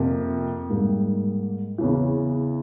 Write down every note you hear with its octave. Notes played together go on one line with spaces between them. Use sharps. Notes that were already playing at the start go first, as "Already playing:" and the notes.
Already playing: F2 C3 F3 A#3
G#2 G3 A#3
E2 C#3 E3